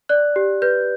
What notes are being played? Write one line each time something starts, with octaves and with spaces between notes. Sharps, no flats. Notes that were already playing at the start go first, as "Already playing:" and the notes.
D5 F#6
G4
B4 G6